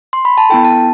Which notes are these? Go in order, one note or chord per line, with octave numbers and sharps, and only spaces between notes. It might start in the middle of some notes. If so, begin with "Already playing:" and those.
C6
B5
A5
B3 E4 A4 G5
A5